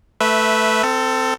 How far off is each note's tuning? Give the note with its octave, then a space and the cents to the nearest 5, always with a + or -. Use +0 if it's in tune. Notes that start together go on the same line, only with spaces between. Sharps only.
A3 +0 B4 +0 E5 -15
C4 -15 A4 +20